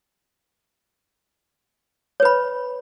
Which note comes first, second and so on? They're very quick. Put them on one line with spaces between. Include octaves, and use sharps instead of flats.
C#5 B4 B5